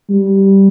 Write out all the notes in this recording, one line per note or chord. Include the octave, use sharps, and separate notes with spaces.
G3